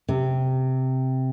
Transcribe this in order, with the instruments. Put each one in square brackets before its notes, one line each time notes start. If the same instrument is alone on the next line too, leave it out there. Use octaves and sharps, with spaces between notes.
[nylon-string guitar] C3